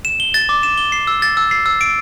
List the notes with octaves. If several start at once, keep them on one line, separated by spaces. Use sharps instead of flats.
E7
G7
A6
D6
E7
G7
C7
E6
A6
E6
C7
E6
D7